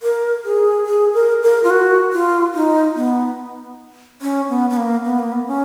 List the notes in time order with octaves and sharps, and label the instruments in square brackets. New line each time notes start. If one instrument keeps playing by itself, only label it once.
[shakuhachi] A#4
G#4
G#4
A#4
A#4
F4
F#4
F4
D#4
B3
C#4
B3
B3
A#3
B3
A#3
B3
C#4